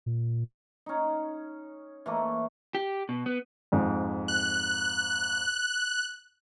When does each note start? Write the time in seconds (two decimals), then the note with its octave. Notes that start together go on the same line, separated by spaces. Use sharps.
0.06 A#2
0.86 C#4 D#4
2.06 E3 A3 A#3
2.75 G4
3.09 B2
3.26 B3
3.72 F2 G#2
4.28 F#6